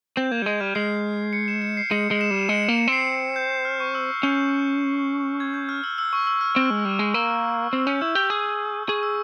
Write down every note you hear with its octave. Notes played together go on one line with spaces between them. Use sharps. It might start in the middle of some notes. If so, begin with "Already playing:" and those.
C4 G6
A#3 G#6
G3
G#3 G#6
G3 F6
G#3 C7
C#7
E7
C#7
C7
G#3 C#7
G#3
E7
G3
G#3 C#7
A#3 E7
C#7
C4 C7
G6
F6
C#6
E6
F6
C#4 G6
G#6
G6
F6
E6
E6
C#6
E6
F6
C4
G#3
G3
G#3
A#3 E6
C4 E6
C#4 G6
E4 E6
G4 E6
G#4
G#4 C#6
E6